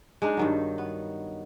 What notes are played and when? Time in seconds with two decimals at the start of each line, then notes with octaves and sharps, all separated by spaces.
0.22 G#3 D4 D#4
0.37 G2 D#3 F#3
0.78 B3